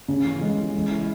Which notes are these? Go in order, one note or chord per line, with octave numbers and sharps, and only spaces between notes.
C#3
E3
G#3
E3
G#3
E4